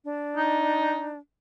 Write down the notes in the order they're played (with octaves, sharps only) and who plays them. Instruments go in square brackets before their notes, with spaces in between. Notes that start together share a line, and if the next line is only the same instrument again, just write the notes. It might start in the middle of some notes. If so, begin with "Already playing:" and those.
[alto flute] D4
[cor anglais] D#4